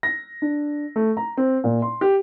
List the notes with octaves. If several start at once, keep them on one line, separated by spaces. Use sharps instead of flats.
A#6
D4
A3
A#5
C4
A#2
C6
G4